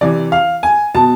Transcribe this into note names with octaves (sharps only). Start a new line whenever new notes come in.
C3 E3 D5
F5
G#5
B2 A5